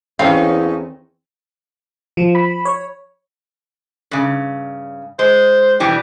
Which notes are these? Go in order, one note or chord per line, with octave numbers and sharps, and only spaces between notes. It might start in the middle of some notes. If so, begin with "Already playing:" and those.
E2 E3 C4 C#4 D#4 A4 F5
F3
B5
C#5
G2 C#3
G#3 C5
B2 E3 G3 G4